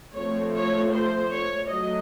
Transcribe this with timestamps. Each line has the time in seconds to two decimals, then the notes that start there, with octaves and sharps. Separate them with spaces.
0.14 F3 A3 C4 C#5
0.54 C#5
0.92 C5
1.32 C#5
1.71 F#3 A3 D#5